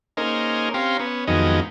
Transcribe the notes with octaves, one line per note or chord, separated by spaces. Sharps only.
A#3 C#4 D#4 G#4 A#4 C5
C4 C#4 G4 F5 A#5 C6
B3 C#4
F2 D#3 F#3 G#3 B3 D#4